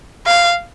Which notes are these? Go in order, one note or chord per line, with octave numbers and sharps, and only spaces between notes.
F5